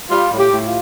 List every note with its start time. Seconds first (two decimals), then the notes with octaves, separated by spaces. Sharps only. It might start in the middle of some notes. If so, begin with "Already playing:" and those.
0.10 G3 F4
0.31 A2
0.38 G4
0.52 A2
0.67 F4